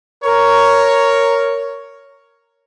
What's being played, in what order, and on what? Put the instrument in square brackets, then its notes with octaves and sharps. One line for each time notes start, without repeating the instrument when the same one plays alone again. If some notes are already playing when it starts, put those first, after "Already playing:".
[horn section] A#4 C#5